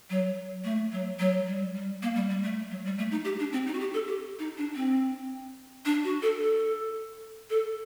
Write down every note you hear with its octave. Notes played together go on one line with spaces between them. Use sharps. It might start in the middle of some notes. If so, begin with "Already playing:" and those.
F#3
A3
F#3
F#3
G3
G3
A#3
G3
G3
A3
F#3
G3
A3
D#4
G4
D4
C4
D#4
F#4
G4
A4
G4
D#4
D4
C4
D4
F#4
A4
A4
A4